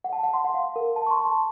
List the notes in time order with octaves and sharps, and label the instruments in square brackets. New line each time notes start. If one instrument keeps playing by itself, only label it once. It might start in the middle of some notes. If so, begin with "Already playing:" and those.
[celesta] F#5
A5
F#5
C6
F#5
F5
A#4
A5
C#6
C6
A5